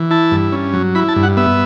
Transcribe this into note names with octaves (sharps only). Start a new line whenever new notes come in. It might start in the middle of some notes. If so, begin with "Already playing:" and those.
Already playing: E3
E4 A5
G2
C#4
F#3
E4 B5
A5
G2
F#5
B3 E5